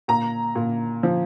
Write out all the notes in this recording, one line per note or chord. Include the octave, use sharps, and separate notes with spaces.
A#2 A#5
A#2
F3